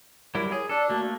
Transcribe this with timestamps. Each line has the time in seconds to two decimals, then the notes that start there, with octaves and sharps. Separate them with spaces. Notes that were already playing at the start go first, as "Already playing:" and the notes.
0.35 F#3 G3 E4 A#4
0.52 G#4 C#5
0.69 D4 A4 D5
0.90 A3 A#3 F#4